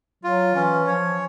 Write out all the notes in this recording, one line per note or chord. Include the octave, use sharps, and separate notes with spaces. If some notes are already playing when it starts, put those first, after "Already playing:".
F#3 F4
E3 C#4
F3 C#5